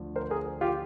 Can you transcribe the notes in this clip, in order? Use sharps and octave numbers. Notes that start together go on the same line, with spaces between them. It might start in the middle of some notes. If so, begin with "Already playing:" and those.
Already playing: D2 D3 F3
A#4 C5
G#4 A#4
F4 G4